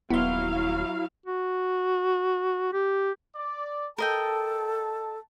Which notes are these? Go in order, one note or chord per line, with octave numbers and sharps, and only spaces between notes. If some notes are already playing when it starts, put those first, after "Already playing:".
D#1 F#3 B3 E4 F5 C6
F#4
G4
D5
A4 A#4 D#5 G5 A5